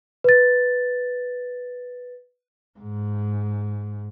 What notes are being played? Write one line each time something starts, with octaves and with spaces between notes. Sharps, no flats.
B4 A6
G#2